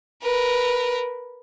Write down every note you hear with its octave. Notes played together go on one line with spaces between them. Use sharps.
A#4 B4